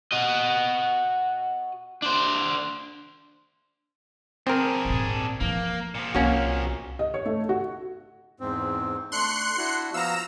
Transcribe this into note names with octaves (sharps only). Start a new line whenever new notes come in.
F#4 D#5
D4 C5
C4 D4 G#4 A#4
G#1 A#2
E3 F3 A#3
A#2 F3
C2 A#3 C#4 F#4
D#5
C#5
A3
F#4
E2 G#2 C4
A3 D4 C6 F#6 C#7
D4 E4 F#4
F3 B3 F5 A#5 E6